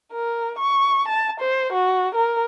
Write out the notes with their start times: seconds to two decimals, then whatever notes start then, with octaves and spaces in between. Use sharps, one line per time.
0.12 A#4
0.58 C#6
1.08 A5
1.41 C5
1.73 F#4
2.15 A#4